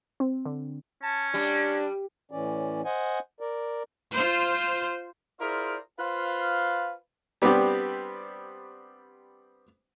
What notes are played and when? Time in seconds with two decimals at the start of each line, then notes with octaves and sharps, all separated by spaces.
0.20 C4
0.45 D3
1.03 C#4 A5
1.34 G3 D4
2.31 A2 E3 C#4 D5
2.85 C5 D#5 F#5 G#5
3.40 A#4 D5
4.11 F4 C5
5.40 E4 F4 G#4 A#4 C5 D5
6.00 F4 B4 C5 F5
7.42 G3 B3 C4 D4 G4